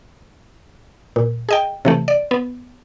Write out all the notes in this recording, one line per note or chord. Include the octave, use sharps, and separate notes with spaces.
A#2
G#4 D#5 G5
C3 E3 A3
D5
B3